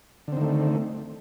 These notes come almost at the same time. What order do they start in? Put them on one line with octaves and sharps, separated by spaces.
D3 C4 D#3 A3